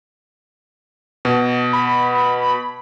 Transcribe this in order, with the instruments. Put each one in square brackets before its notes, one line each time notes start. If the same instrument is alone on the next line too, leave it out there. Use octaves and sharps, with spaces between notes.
[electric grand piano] B2
[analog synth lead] B5